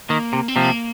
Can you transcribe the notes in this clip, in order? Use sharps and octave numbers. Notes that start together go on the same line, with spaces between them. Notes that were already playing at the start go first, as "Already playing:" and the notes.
D#3 A#3
C3
C4
C3 F3 A#3